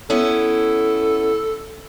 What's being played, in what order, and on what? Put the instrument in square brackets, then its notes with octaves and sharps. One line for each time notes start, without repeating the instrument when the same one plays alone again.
[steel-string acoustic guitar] B3 C#4 E4 [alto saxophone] A4